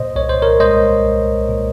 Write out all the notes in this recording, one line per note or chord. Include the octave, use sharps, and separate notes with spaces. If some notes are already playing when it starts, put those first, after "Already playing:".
Already playing: A#2 C5 D#5
C2 C#5
C5
A#4 C#5
G#3 C5 D#5
C2
A#2